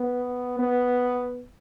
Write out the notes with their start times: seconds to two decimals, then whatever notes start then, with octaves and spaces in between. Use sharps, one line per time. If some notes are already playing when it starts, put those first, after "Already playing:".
Already playing: B3
0.59 B3